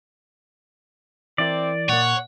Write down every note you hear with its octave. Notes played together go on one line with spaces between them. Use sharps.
E3 C4 E4 A#4 D5
A#2 A#3 C#5 F#5